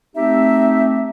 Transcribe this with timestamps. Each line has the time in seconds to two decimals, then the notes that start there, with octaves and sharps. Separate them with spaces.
0.16 A3 C4 D#4 G4 E5